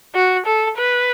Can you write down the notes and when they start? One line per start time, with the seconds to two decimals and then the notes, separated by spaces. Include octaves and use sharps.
0.15 F#4
0.46 A4
0.77 B4